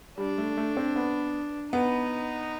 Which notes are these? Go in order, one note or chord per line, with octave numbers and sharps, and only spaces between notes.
G3 D4
A3
A3
C4
B3
B3 D#4